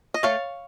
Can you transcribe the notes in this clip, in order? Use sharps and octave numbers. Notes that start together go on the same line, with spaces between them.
D#5
A3 C#5 F5